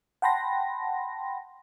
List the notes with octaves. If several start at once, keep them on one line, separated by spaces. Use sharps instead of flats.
F#5 G5 A5 B5 C6 A#6